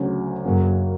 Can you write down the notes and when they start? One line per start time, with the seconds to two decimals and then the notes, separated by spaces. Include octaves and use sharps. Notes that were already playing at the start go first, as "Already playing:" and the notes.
Already playing: D2 C#3 F#3 C#4
0.45 F#2 C#3 F#3 A#3